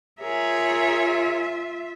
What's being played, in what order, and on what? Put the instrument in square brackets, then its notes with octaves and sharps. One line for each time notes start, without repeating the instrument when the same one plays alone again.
[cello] F4 E5 [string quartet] G#4 A#4 C#5